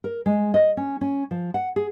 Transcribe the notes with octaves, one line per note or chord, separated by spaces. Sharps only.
A#4
G#3
D#5
C#4
C#4
F3
F#5
G#4